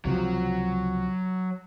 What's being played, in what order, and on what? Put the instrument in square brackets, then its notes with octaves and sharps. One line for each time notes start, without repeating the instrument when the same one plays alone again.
[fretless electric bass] C#2 C3 F3 [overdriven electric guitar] F#3